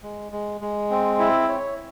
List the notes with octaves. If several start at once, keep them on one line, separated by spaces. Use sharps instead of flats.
G#3
G#3
G#3
C4
E4
C#5